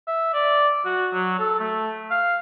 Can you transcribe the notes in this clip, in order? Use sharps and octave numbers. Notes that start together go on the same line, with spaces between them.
E5
D5
F#4
F#3
A4
A3
F5